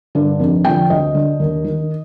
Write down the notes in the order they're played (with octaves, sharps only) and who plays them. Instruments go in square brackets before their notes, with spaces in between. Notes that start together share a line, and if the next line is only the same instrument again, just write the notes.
[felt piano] G2 D3
F1
F2 D3 G5
D2 D#5
D3
D#2
D#3